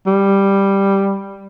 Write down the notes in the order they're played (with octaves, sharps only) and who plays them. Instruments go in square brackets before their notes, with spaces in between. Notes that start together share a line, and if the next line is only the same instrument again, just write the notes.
[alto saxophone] G3